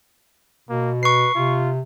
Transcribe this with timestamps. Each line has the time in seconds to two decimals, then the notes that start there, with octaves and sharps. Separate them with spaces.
0.69 B2 A#3
1.03 B4 C#6 C7
1.35 C3 F4